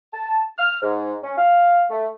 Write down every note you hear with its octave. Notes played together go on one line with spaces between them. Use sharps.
A5
F6
G#2
C#4
F5
A3